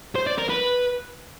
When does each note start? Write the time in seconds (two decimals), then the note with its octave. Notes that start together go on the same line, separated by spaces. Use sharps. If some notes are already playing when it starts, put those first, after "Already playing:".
0.15 C5
0.27 D5
0.38 A#4
0.49 B4